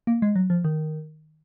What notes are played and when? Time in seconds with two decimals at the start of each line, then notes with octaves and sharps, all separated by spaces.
0.07 A#3
0.22 G#3
0.36 F#3
0.50 F3
0.64 D#3